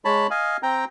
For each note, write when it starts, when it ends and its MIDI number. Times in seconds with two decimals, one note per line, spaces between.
0.05 0.27 56
0.05 0.27 73
0.05 0.27 81
0.05 0.27 83
0.31 0.57 75
0.31 0.57 77
0.31 0.57 80
0.63 0.85 60
0.63 0.85 79
0.63 0.85 82